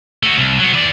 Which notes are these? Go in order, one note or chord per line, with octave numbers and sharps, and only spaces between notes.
A3 F#4
C2
F#3 B3
E3 D5